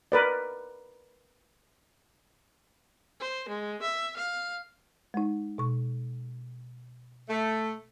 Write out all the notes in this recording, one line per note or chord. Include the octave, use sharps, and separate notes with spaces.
A#4 B4 D5
C5
G#3
E5
F5
G#3 D#4
B2 C#6
A3